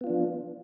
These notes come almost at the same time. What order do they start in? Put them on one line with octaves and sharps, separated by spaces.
B3 F4 D4 F3